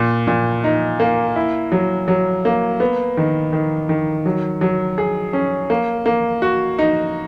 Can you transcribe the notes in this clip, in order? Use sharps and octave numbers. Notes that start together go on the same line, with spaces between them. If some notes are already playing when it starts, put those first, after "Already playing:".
Already playing: A#2
A#2
D#4
A#3
E4
F#3
F#3
A#3
B3
D#3
D#3
D#3
F#3
F#3
G#4
C#4
A#3
A#3
F#4
D#4